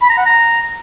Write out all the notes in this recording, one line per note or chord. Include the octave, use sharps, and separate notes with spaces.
B5
A#5
F#5
A#5